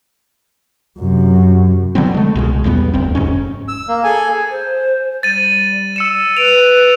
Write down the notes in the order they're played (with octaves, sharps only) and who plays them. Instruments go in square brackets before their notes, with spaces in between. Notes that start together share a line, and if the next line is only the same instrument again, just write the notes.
[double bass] F#2 C3
[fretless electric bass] D3 F#3 B3 C4
G#3 A3
C2 B2 G#3
A1 E2 G3 B3
F1 D2 C4
F1 G#2 C#4
[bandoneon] E6
A#3
G#4 A4 G#5
[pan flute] C5
[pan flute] G3 [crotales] A6 D#7
[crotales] E6 C#7 E7
[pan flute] B4 [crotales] D7 F7